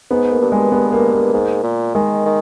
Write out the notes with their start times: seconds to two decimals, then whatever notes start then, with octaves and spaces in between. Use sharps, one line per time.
0.11 G#2 B3
0.31 A#3
0.42 G2
0.52 G#3
0.72 G2 B3
0.92 A#3
1.13 A#3
1.33 G#2
1.63 A#2
1.95 D#3 G#3
2.26 D#3